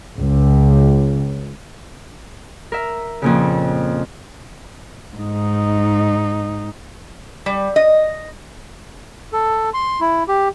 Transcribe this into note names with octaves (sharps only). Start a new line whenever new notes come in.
C#2
A#4 E5
F2 A#2 C#3
G#2 D#4
G3
D#5
A4
C6
E4
G4